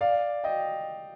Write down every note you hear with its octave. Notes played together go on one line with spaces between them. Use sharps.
D5 F5
D#5 G5